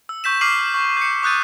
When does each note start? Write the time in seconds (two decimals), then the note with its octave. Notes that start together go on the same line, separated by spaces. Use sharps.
0.09 E6
0.24 C#6 G6 B6 E7
0.41 D6 F6 C7 D#7 F#7
0.74 C#6
0.97 G6 C#7
1.22 C#6 D#6 F#6 G6 A6 D#7